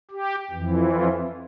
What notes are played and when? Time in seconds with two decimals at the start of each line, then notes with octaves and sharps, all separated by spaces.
0.11 G4
0.51 F2 E3
0.92 F4